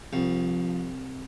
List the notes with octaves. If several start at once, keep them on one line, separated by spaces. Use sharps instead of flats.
C2 F3